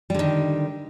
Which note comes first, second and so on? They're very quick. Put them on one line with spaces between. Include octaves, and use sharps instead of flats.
G3 D3 D#3